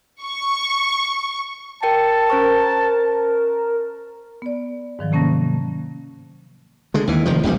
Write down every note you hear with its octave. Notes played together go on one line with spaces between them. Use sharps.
C#6
A#4 G5 A5 C#7
C#4 A#4 C5 C#6
B3 D5
G#2 D#3 F3 F#3
C3 A#3 C#4 A5 A#6
D3 G#3
D#2 E3
F1 D#3 F3
E1 A#1 C3 G3